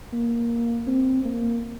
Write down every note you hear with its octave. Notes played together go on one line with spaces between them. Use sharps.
A#3
C4
A#3